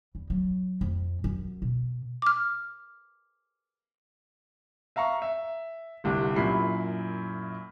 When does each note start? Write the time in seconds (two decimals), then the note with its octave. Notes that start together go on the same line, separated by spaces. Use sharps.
0.15 E2
0.30 F#3
0.81 F2
1.24 F#2
1.62 B2
2.22 D6 F6
4.96 E5 F5 A#5 C#6
5.22 E5
6.04 G1 C2 G4
6.36 F#2 A#2 E4 B5 C7